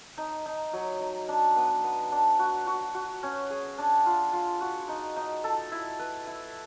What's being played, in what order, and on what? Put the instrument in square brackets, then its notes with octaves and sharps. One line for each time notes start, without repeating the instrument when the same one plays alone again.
[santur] D#4
D#4
F#3
D#4
D4
B3
B3
D4
F#4
F#4
F#4
C#4
G#4
D4
F4
F4
F#4
D#4
D#4
A4
E4
B4
E4